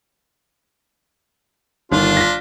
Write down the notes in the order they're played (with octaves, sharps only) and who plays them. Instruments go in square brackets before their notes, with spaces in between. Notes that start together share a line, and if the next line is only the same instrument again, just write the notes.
[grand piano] G1 D#3 [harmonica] D4 F4
[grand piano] A#6 B6